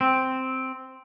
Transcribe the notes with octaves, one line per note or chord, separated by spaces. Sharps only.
C4